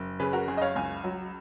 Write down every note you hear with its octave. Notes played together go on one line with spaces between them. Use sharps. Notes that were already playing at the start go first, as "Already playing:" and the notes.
Already playing: F#1
C#3 G#4 B4
F#4 A#4
F#1 G#4
D#5
C#5 F5
C#2 F5 G#5
F#3